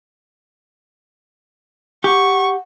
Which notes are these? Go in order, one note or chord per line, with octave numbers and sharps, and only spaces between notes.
G4 F#5 C#6